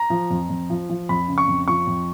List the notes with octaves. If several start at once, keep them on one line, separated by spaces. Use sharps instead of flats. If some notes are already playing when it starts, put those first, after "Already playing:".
Already playing: A#5
F3
F2
F2
F3
F3
F2 B5
C#3
C#6
F2
F3 C#6
F2